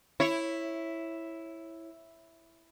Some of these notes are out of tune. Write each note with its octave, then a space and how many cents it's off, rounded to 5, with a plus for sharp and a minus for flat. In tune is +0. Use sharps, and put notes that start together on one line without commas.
E4 +0 C#5 -15